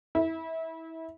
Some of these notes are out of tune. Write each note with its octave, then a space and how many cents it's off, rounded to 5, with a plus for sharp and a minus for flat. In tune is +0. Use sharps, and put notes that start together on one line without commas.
E4 -25